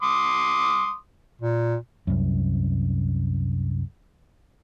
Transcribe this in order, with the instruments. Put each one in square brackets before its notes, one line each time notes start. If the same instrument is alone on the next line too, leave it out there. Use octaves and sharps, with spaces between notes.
[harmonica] C6 D6 D#6
[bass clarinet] A#2
[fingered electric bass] C2 F#2